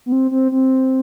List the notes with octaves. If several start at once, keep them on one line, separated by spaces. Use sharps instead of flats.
B3
C4
C4
C4